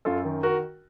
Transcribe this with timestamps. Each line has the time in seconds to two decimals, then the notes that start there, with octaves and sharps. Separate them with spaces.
0.05 F#2 F4 A4
0.25 D#3
0.43 F#4 A#4